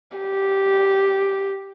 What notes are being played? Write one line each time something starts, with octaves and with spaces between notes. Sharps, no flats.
G4